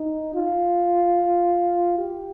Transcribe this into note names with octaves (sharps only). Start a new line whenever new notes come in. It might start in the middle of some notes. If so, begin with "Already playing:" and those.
Already playing: D#4
F4
G4